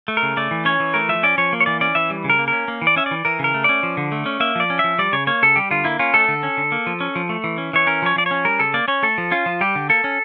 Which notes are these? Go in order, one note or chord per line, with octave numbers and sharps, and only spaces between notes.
A3
A#4
C#3
A3 D5
E3
C#4 C#5
E3
A3 A#4
F3 E5
C#4 D5
F3 C#5
A#3
C#5
E3 D5
C#4 D5
E3 E5
G3
C#3
A#4
A#3
C#4 A#4
A#3
E3
D5
C#4 E5
D5
E3
E3 A#4
C#3 A#4
A3
C#4 D5
F3
D3
A3
C#4
A#3 E5
F3 D5
C#4
F3 E5
G3 D5
C#3 C#5
A#3 C#5
C#3 A4
G3 G4
D3 F4
A#3 E4
C#4 F4
A3 A4
D3
C#4
D3
A#3
F3
C#4
F3
A3
E3
C#4
E3 C#5
C#4 A#4
F3 C#5
F3 D5
C#4 C#5
G3 A#4
C#3 A4
A#3 D5
C#4 C#5
A3 A4
F3
C#4 F4
F3
G3 G4
D3
A#3 A4
C#4